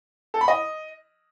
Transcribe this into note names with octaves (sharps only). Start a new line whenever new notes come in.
A4
B5
D#5